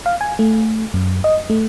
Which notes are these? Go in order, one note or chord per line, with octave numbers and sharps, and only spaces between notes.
F5
G#5
A3
F#2
D#5
A3